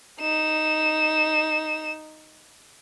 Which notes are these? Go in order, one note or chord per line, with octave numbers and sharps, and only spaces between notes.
D#4 E7